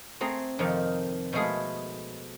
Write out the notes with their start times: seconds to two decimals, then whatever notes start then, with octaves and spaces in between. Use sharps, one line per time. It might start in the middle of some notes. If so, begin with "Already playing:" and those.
0.21 A3 C4 G#4 A#5
0.59 F2 C3 D#3 F3 D#4
1.33 B2 F3 G#3 A3 G#4